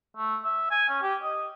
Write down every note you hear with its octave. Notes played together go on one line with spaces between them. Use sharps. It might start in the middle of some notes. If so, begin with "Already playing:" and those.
A3
E5
G#5
C#4
G4
D#5